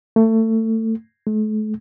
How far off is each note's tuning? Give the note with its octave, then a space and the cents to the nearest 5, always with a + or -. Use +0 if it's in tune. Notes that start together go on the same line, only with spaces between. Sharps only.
A3 +25
A3 -40